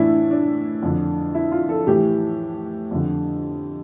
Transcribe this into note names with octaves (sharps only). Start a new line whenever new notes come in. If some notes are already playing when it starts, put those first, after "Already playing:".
Already playing: A2 E3 D4 E4
D4
F2 D3
E4
F4
A4
A2 E3 G4
F2 D3